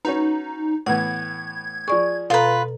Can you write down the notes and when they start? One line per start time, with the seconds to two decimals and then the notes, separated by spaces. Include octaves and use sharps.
0.05 C#4 D#4 F#4 B4
0.86 A2 E3 B3 F#5 G#6
1.88 F3 G#4 D5 C#6
2.30 B2 F4 A4 B4 A#5